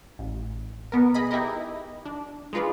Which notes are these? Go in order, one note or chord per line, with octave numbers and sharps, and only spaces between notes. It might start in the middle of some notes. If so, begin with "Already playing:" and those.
A1
B2 B3 A#4
G#4 D#5 B5
D#4 E4 G4 A#4 D#5
D4
G#3 D#4 F4 B4 D5